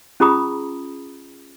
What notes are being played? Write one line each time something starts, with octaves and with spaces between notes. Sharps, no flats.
C#4 F4 G#4 A#5 B5 D#6